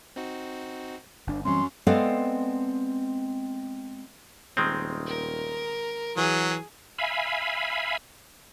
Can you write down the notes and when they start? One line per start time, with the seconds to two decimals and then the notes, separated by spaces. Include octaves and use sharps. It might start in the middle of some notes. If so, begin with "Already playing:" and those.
0.16 C4 D#4 F#4
1.27 G1 D4
1.45 F#2 E3 F#3 G3 C4 C#4 C6
1.87 G#3 B3 C4 A4 D5 F5
4.57 D#1 D#3 G#3 C4
5.06 A#4
6.17 E3 F#3 G#4
6.98 E5 F5 G#5 B5